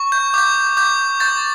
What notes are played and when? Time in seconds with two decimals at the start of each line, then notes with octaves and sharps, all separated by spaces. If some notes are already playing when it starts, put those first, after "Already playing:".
Already playing: C#6
0.12 G6
0.34 D6 G6
0.77 D6 G6
1.20 C#6 G6 A6